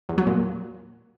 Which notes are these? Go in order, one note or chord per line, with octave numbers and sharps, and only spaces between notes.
E2
F#3
A#2